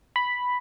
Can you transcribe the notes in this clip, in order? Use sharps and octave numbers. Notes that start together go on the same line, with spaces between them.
B5